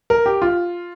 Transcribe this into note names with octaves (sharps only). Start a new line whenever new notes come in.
A#4
G4
F4